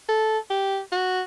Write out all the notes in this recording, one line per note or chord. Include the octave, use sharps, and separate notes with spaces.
A4
G4
F#4